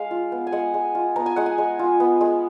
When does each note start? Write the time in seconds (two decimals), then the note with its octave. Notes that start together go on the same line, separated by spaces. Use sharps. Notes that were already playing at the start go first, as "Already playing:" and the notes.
Already playing: G#3 F5
0.11 F4
0.32 B3
0.47 G#5
0.52 G#3 F#5
0.74 G#3
0.95 F4
1.16 B3 A#5
1.26 G#5
1.36 G#3 F#5
1.46 G#5
1.58 G#3
1.79 F4
2.00 B3
2.21 G#3